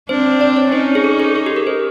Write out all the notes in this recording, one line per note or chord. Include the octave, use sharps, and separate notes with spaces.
C4 D4 C5
D5
C#5
C#4 D#4 C5
G#4
A4
G#4
A4
G4
A#4
C5